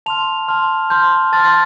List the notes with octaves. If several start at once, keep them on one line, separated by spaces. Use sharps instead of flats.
A5 C6 F6 F7
A5 C6 F6
A5 C6 F6 G6
A5 C6 F6 A6